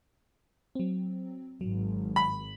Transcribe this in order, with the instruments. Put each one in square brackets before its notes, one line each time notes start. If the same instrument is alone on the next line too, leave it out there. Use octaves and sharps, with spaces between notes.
[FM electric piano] F#3 C4
[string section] G#1 [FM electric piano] F#3
[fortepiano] B5